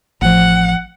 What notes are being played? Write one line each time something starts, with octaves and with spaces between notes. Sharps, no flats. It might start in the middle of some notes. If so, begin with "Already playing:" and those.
A1 F3 F#5